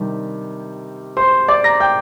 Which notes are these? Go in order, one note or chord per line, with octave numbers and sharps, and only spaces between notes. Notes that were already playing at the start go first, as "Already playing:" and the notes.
Already playing: C3 D#3 G3 D4
C5 C6
D5 D6
A#5 A#6
G5 G6